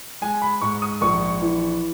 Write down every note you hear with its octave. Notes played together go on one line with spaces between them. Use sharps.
G#3 G#5
B5
G#2 C#6
D#6
A#1 C#6
E3